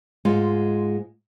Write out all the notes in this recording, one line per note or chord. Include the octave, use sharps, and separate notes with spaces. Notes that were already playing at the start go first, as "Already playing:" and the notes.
G#2 G#3 F4